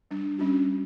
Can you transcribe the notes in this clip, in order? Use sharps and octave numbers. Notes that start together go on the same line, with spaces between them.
G3 D4
G3 C#4 D4 F#4